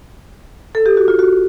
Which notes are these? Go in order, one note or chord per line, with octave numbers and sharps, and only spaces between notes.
A4
G4
F#4
F4
F#4